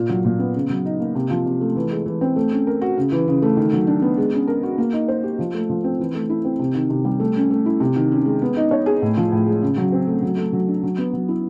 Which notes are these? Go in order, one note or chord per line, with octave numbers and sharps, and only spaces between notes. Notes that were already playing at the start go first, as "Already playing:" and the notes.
Already playing: A#2 F4
F#3
A#2
B3
C#3
F#3
D#4
A#3
C3
F3
C3
A3
E3
G#3
E3
C4
A3
C#4
A#4
F#4
C#3
E3
C#3
A3
D#3
F#3
D4
B3
G#3
C#4
A#4
F#4
A#3
D#4
C5
G4
F3
A3
F3
C4
E3
A3
E4
C4
C3
D#3
C3
G3
A3
C#4
A3
E4
C3
D#3
C#4
G#3
B3
D#4
C#5
G#4
A2
F3
A2
G#3
C#3
F#3
C4
A3
F#3
A3
F#3
D4
F#3
B3
F#3
E4